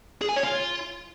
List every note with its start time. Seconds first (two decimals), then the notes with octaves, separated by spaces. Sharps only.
0.22 G#4
0.29 G#5
0.36 C#5
0.44 F4